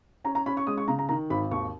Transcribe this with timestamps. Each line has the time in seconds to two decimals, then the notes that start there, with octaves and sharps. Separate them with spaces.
0.24 C#4 A#5
0.35 A#5
0.46 C#4 B5
0.57 C#6
0.67 G#3 D#6
0.78 C#6
0.88 C#3 A#5
0.99 A#5
1.09 D#3 A#5
1.30 G#1 B5
1.51 D#2 C#6